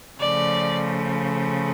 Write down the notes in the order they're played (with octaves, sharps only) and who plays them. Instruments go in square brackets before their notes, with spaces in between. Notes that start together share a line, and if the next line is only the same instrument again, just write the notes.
[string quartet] C#3 F3 A3 D5